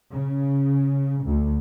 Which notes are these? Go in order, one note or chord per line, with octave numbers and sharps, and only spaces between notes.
C#3
D2